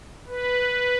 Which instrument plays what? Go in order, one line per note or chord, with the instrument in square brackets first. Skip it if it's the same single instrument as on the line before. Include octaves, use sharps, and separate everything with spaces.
[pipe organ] B4